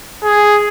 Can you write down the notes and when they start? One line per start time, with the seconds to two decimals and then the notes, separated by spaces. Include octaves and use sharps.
0.24 G#4